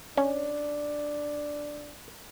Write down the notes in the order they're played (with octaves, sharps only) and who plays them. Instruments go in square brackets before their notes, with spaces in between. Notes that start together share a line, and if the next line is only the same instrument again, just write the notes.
[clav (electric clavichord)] C#4 [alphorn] D4